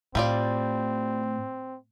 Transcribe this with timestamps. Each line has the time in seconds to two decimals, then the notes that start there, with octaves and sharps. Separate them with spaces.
0.15 A2 G3 C4 F4 D5